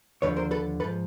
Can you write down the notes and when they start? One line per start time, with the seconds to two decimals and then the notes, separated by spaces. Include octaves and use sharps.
0.22 D#2 D3 F3 B4 C#5
0.36 A#4 C5
0.51 A4 B4
0.80 G#2 F3 A4 B4